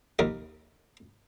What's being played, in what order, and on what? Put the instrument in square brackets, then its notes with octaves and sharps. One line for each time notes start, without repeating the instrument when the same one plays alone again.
[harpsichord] D#2 A#4